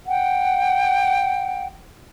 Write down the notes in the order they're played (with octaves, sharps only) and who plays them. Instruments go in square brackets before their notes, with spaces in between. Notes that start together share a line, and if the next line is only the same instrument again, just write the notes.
[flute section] F#5 G5